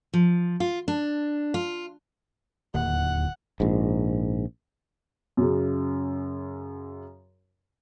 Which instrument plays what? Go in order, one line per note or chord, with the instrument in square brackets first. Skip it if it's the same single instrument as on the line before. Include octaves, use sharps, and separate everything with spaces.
[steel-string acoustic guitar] F3
F4
D4
F4
[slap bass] D1 [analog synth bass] D#2 [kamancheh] F#5
[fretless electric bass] A#1 G#2
[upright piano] F#2 C#3